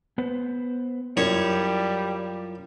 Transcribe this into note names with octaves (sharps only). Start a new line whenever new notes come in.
B3 B4 C5
F#2 G3 E4 F4 C#5